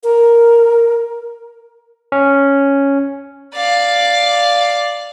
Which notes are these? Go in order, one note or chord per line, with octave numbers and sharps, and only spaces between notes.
A#4
C#4
D5 F5